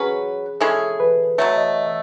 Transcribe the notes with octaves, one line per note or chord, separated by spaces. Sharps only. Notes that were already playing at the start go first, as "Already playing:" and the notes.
Already playing: F#3 C#4 G#4 B4
G#3 C#4 E4 G#4 A4
B4
B2 F#3 A3 C#5
D#5
E5